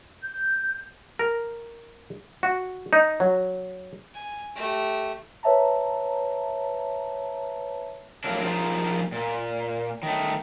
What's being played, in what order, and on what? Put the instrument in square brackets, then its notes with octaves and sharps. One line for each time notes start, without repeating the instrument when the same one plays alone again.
[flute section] G6
[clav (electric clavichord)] A#4
F#4
D#4
F#3
[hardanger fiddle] G#5
A3 G4
[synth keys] B4 C#5 E5 A5 A#5
[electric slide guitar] F2 A2 F#3 A#3 D4
F3 A#3 D#4 F4 G#4 C5
A#2
D#3 A3